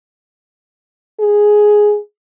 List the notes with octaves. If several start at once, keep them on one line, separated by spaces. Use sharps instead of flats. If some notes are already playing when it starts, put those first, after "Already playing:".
G#4